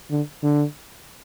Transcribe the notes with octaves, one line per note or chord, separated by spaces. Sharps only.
D3
D3